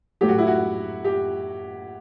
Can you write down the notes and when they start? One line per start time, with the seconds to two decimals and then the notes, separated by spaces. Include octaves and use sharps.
0.21 A2 F#3 A3 G4
0.29 F#4
0.38 E4
0.47 F#4
1.04 G4